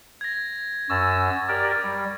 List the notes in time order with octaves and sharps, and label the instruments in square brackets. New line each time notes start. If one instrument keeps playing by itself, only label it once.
[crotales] G#6 A#6
[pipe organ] F#2 E6 [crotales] C#6 A6
[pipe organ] G4 A#4 D5
G3